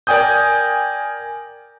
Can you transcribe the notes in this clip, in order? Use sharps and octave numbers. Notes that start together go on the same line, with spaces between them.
A#4 D5 G5 G#5 D#6 G6